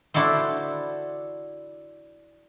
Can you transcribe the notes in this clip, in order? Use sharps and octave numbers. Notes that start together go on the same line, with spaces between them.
D4 E4 F#4 A4 C5